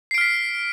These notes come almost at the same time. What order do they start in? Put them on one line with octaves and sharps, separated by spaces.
C7 D7 F6 B6